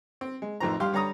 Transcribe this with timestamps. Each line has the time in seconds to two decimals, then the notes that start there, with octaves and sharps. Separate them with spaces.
0.21 C4
0.42 G#3
0.60 A1 F2 D#3 C5 A#5
0.80 G2 G4 F5 C6
0.92 D3 G3 C#5 A#5 D#6